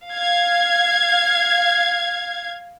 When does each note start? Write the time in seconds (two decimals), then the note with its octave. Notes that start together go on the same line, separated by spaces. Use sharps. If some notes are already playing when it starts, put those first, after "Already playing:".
0.10 F5 G#6